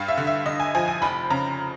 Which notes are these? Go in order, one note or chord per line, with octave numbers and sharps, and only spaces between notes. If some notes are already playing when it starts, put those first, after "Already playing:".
Already playing: G2 F5
E5
D3
E5
D3 D#5
G#5
F3 G#5
G#5
F1 B5
C#3 A#5